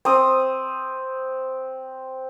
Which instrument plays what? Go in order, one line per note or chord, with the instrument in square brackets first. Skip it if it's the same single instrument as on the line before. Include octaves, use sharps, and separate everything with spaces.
[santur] C4 D#6